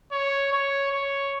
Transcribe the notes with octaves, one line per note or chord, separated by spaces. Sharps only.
C#5
C#5
C#5